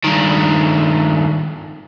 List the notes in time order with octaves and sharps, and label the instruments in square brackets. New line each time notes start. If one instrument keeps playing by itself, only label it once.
[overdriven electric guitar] G2 D#3